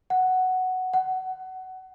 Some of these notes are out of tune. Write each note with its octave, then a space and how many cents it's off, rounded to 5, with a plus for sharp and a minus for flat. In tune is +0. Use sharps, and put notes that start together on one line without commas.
F#5 +5
F#5 +20